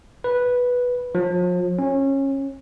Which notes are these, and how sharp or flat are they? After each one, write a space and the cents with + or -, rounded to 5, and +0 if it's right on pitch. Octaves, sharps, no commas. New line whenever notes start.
B4 -5
F3 +40
C#4 -20